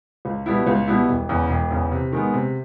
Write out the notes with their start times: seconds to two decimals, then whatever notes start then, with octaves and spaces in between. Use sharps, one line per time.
0.25 C#2
0.46 B2 G3 B3 E4
0.67 C#2
0.87 B2 G3 B3 E4
1.08 E1
1.29 E2 C#3
1.49 E1
1.71 E2 C#3
1.92 C3
2.12 D#3 G#3 B3
2.33 C3